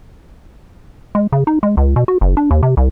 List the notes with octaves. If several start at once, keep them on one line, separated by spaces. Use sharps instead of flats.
G#3
C#3
D#4
G#3
C#2
B2
F#4
F#1
D4
D#2
C3
C2